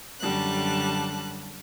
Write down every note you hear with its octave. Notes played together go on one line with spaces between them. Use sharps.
F#2 D3 G3 A5 F#6